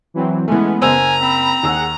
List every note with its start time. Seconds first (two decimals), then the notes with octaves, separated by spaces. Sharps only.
0.14 E3 F#3 C4
0.48 E3 G#3 A3 B3 C#4
0.82 F#1 C5 G#5 A#5 E6
1.20 C4 B5
1.63 D#2 G#4 F#5 E6